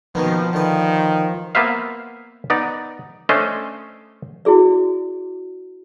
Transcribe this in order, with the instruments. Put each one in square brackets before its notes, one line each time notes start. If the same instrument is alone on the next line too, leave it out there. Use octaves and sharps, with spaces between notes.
[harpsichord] B2 A#3 B3 [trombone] D#3 [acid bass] F3
[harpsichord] D3 B4 [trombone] D#3
[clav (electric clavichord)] A#3 B3 B4 C5 E5 F5
B3 D#4 D5 A#5
A3 C#4 D4 C5 D#5
[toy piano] E4 F#4 G#4 D5